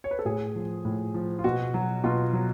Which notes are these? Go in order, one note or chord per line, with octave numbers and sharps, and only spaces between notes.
C#5
B4
A4
A2 G#4
F3
A2
F3
F4
B2 F#4
F#3
B2 F4
F#3